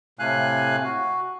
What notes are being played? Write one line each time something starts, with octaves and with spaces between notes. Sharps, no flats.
A2 C3 A3 F5 G#5 F#6
F#4